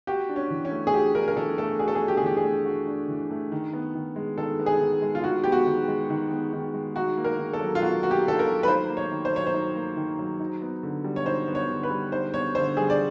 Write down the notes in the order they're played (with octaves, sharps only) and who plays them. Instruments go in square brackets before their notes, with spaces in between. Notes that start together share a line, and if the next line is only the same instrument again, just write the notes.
[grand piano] F#4 [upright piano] G4
[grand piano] D4
[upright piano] C#4
[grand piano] E3
[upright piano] C#4
[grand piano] A3
[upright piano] G#4
[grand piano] F#4 [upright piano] G4
[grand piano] D4 [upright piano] A#4
[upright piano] A#4
[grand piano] E3 [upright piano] A4
[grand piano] A3 [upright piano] A4
[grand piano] F#4 [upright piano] G#4
[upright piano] A4
G#4
[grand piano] D4
[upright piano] G4
G#4
[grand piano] E3 [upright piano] G4
[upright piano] G#4
[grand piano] A3
F#4
D4
E3
A3
D#3
B3
D#3
G#3
[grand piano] D#3 [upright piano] A4
[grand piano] B3
[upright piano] G#4
[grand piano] D#3
G#3
[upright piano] F4
[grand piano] D#3 [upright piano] F#4
[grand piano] B3 [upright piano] G4
[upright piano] F#4
[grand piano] D#3
G#3
D#3
B3
D#3
G#3
[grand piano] D#4 [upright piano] F#4
[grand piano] A#3
[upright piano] A#4
[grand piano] D#3
[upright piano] A4
[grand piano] F#3
[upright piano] F4
[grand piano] D#4 [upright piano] F#4
[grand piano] A#3 [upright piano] F#4
[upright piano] G4
[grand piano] D#3 [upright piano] A4
[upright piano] A#4
[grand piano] F#3
[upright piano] B4
[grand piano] D#4 [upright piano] C5
[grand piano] A#3
[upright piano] C#5
[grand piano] D#3
[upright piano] C5
[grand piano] F#3 [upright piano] C#5
[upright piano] C5
[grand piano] D#4
A#3
D#3
F#3
D#4
B3
D3
G3
[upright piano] C#5
[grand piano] D#4 [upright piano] C5
[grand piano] B3
[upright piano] C#5
[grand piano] D3
[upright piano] B4
[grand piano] G3
[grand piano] D#4 [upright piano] C5
[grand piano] B3 [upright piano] C#5
[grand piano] D3 [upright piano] C5
[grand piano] G3 [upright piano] G#4
[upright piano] D5